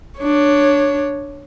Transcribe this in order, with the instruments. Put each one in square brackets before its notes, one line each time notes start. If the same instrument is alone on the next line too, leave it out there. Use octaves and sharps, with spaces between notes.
[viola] D4 C#5